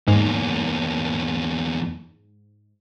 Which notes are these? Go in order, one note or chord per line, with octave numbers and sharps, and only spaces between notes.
E2 G#2 A#3